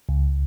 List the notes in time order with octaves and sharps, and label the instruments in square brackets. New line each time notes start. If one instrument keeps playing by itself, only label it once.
[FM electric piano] C#2